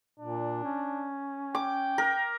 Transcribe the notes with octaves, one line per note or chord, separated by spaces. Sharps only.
A#2 D4
C#4
G5 D6
A#4